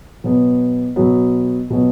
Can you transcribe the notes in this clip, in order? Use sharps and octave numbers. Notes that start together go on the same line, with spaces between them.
B2 F#3 B3
B2 F#3 B3
B2 F#3 B3